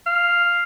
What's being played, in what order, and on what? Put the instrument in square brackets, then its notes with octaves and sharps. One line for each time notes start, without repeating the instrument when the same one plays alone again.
[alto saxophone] F5